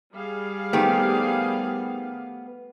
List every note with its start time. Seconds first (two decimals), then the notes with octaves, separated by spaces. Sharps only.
0.13 G3 G#4 F5
0.73 D#3 A3 B3 C4 G4